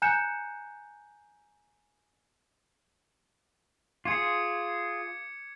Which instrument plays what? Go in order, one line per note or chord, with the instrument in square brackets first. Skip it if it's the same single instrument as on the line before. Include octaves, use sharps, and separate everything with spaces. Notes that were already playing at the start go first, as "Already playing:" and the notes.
[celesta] G#5 A#5 F#6 G6 C#7 E7
[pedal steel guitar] F4 G#4 [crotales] D6 G#6 C#7